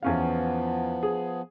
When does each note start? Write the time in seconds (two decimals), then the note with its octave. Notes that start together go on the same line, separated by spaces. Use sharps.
0.03 E2 F3 B3 C#4 F5
1.03 G#4